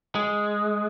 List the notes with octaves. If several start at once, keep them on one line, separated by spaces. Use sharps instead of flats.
G#3